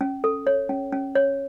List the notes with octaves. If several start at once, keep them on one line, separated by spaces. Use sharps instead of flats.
C#4
A4
C#5
C#4
C#4
C#5